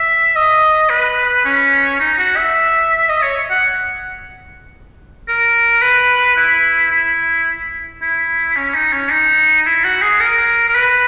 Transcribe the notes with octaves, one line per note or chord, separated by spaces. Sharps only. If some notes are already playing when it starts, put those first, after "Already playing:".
Already playing: E5
D#5
B4
C#4
D#4
F#4
E5
D#5
C#5
F#5
A#4
B4
E4
E4
E4
C#4
D#4
C#4
D#4
E4
F#4
G#4
A#4
A#4
B4